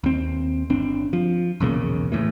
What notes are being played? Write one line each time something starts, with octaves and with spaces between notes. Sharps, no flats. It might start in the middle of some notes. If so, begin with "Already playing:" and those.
D#2 C4
G1 C4 D4
F3
B1 E2 A#2 C#3
E2 A2 E3